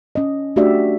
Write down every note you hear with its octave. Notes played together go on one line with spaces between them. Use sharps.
C#4 D#5
A3 D4 F#4 G4 D5 E5